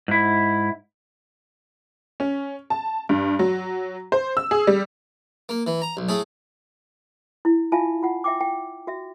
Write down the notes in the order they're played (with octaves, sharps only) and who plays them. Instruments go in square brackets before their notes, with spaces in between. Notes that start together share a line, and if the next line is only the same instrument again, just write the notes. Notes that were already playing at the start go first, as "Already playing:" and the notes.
[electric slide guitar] G#2 E4
[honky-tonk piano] C#4
A5
G2
F#3
C5
E6
G#4
G3
[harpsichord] A#3
E3
A#5
B1
A2 A3 G#4
[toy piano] E4
F4 E5 F5 G#5 A5
F4 F#5
E5 G5 D6
G5
F#4 E5